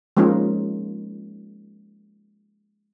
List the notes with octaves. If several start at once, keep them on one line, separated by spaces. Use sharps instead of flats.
F3 G#3 A#3 C#4 D#4 F4